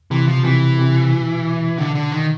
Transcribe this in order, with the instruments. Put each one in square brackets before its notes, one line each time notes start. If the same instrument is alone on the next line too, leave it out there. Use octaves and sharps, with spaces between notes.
[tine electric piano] C3 [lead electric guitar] E3
[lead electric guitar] F3
[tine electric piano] B2
[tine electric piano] C3 [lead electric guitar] E3
[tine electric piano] C3
B2
[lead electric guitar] D3
D3
D#3